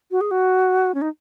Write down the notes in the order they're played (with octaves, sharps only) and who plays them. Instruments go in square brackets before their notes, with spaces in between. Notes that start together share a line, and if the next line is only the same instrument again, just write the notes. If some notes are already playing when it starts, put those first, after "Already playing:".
[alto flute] F#4
G#4
F#4
C#4
D#4